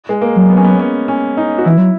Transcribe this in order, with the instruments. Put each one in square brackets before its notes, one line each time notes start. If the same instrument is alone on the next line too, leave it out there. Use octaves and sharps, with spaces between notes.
[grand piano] G#3
A#3
[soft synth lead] F#3
[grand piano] B3
C#4
B3
C#4
C#4
D#4
F#4
[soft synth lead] E3 [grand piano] E4
[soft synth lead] F#3